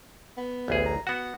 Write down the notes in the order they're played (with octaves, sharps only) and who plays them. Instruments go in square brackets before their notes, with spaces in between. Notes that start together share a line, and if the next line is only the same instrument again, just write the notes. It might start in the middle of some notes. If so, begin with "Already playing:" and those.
[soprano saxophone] B3
[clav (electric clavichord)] A1 D2 G#4
[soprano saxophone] A#5
[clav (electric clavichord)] B3 F#4 [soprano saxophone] F#5